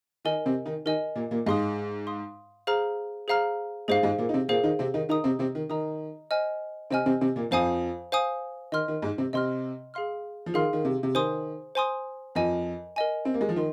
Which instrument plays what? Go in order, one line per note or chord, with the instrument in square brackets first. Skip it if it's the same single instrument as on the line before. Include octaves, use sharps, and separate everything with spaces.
[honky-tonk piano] D#3 D#4 [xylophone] A#4 D#5 G#5
[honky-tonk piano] C3 C4
D#3 D#4
[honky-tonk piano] D#3 D#4 [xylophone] A#4 D#5 G#5
[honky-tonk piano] A#2 A#3
A#2 A#3
[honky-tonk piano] G#2 G#3 [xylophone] F5 C6 D#6
[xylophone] F5 C6 D#6
G#4 C5 F5 A#5 F6
G#4 C5 F5 A#5 F6
[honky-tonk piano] G#2 G#3 [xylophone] G#4 C5 F5
[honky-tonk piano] G#2 G#3
A#2 A#3
D#4
C3 C4
[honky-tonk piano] A#2 A#3 [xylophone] G#4 C5 F5
[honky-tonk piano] D#3 D#4
C3 C4
D#3 D#4
[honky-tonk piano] D#3 D#4 [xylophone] D#5 A#5 D#6
[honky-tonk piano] C3 C4
C3 C4
D#3
[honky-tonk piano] D#3 [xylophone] D#5 A#5 D#6
[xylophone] C5 D#5 G#5 F6
[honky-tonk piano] C3 C4 [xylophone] C5 D#5 G#5 F6
[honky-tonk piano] C3 C4
C3 C4
A#2 A#3
[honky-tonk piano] F2 F3 [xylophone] C5 F5 G#5 D#6
[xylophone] C5 F5 G#5 D#6
[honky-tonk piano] D#3 [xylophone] D#5 C6 F6
[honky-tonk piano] D#3
G#2 G#3
C3 C4
[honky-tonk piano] C3 C4 [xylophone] D#5 C6 F6
[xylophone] G#4 F5 C6 F6
[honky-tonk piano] F3
[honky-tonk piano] D#3 [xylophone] G#4 F5 C6 F6
[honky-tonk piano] D#3
C3
C3
[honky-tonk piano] D#3 [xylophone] C5 G#5 C6 D#6
[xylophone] C5 G#5 C6 D#6
[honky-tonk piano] F2 F3 [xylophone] A#4 D#5 G#5
[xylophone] A#4 D#5 G#5
[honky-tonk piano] C4
A#3
G#3
F3
[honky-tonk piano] D#3 [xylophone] D#5 C6